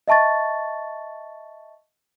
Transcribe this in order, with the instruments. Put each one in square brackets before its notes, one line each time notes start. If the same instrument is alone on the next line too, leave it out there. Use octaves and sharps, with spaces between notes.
[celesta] D#5 E5 A5 C#6 A6